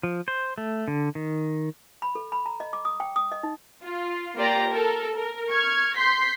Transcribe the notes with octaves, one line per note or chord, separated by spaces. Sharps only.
F3
C5
A3
D3
D#3
B5
A4
B5
A#5
D#5
D6
D#6
G5
D#6
D#5
D#4
F4
A#3 F4 G4 D5 G5 A#5
A4 A#4
A#4
C#6 F6 G#6
C6 G6 B6 C7